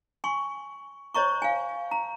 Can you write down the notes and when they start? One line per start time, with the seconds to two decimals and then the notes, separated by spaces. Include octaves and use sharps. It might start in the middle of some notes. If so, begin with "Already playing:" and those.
0.24 G#5 C6 C#6
1.14 C5 C#5 D#5 A#5 C#6
1.42 F5 G#5
1.91 A#5